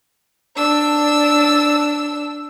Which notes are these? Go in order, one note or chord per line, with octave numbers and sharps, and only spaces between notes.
D4 E6